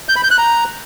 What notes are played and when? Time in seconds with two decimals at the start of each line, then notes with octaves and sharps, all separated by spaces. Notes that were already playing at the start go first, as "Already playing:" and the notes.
0.09 G6
0.16 B5
0.23 G6
0.31 F#6
0.38 A#5